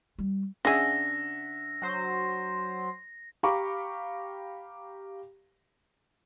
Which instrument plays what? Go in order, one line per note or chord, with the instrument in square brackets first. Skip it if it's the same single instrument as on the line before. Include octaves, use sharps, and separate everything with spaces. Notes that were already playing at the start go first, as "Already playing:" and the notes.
[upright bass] G3
[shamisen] C#3 G#4 [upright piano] D4 E5 F#5 [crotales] A#6
[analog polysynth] F#3 C5 C7
[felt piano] G4 F5 A#5 B5 C#6 D6